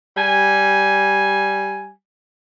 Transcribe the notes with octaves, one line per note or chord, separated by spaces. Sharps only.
G3 G#5